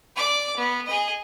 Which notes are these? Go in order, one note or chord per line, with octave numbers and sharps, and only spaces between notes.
D5 D6
B3
G#4 D#5